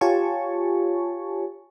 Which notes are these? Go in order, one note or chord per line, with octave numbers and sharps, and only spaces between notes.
F4 G4 C#5 G#5 A5 C#6